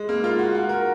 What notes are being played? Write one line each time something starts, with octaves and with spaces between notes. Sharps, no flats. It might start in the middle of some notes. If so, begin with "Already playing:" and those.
Already playing: G#3
A#3
F4
F#4
F#4
A#4